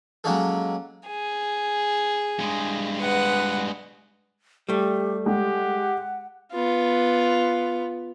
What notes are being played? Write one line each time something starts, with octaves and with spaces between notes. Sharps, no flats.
F#3 G#3 A#3 C#4 G#4 A4
G#4
G2 G#3
B4 F#5
G3 A3 G4
G#3 G4 F#5
B3 F4